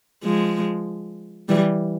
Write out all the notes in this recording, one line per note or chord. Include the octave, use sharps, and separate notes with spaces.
F3 G#3
E3 G3